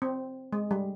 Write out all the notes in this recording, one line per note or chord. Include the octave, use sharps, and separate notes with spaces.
C4
G#3
G3